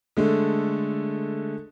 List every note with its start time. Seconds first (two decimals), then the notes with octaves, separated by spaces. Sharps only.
0.17 D3 G#3 A3